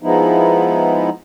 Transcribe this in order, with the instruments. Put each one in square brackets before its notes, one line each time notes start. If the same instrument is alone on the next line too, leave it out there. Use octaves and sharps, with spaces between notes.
[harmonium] F3 G#3 B3 D#4 E4